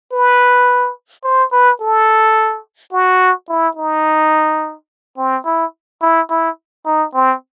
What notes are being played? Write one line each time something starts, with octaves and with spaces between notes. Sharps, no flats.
B4
C5
B4
A4
F#4
E4
D#4
C4
E4
E4
E4
D#4
C4